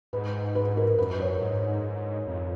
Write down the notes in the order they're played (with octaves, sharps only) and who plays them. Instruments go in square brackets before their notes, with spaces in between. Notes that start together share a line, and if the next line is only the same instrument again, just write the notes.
[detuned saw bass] G#2 [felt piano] B4
[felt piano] B4
A#4
[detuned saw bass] F#2 [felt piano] B4
[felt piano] C#5
[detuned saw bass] G#2
F2